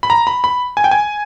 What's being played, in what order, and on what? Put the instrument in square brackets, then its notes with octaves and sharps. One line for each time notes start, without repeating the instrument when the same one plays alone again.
[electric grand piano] B5
A#5
B5
B5
G#5
G5
G#5